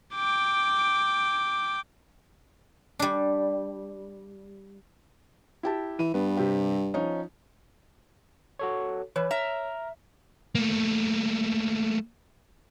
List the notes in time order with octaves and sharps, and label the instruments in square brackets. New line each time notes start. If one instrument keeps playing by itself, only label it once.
[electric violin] G5 D6
[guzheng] G3 D4
[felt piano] E4 G4 A5
[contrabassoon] E3 [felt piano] D#7
[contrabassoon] G2 [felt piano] B3
[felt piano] C3 G4
F3 C#4 D#4
[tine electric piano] F#4 A4 C#5
[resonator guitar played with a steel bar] E3 [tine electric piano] B4 [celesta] C#5
[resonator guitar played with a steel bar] E5 [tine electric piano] A#5 F6
[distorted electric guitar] A3 A#3